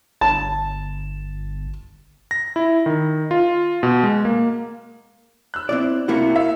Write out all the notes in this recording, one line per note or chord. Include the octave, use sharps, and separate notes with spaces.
G1 A5
A#6
E4
D#3
F4
B2
G#3
A#3
E6 F#6
C4 E4 D5
C3 A#3 E4 F#4 C#7
E5 F5